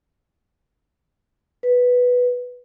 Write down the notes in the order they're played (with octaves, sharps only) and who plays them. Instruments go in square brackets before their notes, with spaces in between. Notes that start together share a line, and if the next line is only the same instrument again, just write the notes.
[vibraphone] B4